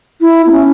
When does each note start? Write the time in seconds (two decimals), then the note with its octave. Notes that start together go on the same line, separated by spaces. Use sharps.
0.21 E4
0.47 B3
0.51 C#4